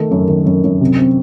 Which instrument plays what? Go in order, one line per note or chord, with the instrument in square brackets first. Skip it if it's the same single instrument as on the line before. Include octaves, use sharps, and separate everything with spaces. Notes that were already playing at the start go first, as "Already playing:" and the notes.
Already playing: [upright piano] D#3 A3
F#2
D#3
F#2
F#2
C3
C4